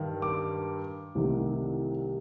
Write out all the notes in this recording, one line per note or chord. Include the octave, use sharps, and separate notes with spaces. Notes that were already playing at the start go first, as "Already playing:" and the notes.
Already playing: G2 D#3
D6
C2 C3 D#3 A3